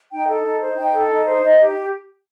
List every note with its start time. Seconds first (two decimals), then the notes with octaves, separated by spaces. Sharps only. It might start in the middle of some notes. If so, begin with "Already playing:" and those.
0.11 D#4 G5
0.27 A4
0.44 D#4
0.61 C5
0.77 D#4 G5
0.93 A4
1.10 D#4
1.25 C5
1.42 D#4 D#5
1.58 G4